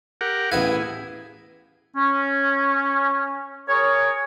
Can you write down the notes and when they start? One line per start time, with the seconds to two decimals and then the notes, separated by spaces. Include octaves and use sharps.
0.21 G4 A#4 F#5
0.52 A1 B3 E4 G#4 F5
1.97 C#4
3.68 G#4 A#4 C#5